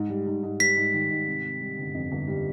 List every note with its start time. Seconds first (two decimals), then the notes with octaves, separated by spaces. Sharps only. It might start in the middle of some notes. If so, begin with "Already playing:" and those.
Already playing: G#2
0.10 G3
0.27 G#2
0.43 G#2
0.60 G3 B6
0.77 G#2
0.94 D#3
1.11 G#2
1.27 C3
1.44 C3
1.61 G3
1.78 G1
1.94 F2
2.12 G1
2.28 G3